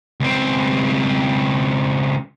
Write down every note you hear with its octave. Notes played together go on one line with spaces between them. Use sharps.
C#2 C4